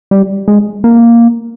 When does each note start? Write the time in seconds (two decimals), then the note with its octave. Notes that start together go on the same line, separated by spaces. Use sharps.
0.11 G3
0.48 G#3
0.84 A#3